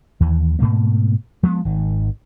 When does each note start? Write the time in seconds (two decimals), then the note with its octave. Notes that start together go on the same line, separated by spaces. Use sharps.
0.20 D#2 E3
0.59 G#2 B2 A3 A#3
1.43 F3 G#3 A3 B3
1.65 G#1 D#3